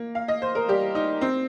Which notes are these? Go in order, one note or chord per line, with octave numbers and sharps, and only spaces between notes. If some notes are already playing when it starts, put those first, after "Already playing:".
Already playing: A#3
F5
D#5
C5
A#4
G3 G4
D#4
C4